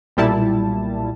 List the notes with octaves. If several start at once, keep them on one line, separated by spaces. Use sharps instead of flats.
B1 A#2 G3 E4 A5